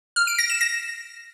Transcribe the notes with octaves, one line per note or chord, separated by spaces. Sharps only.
F6
D7
A#6
E7
A#6